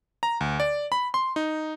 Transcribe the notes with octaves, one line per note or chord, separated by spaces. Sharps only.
A#5
D2
D5
B5
C6
D#4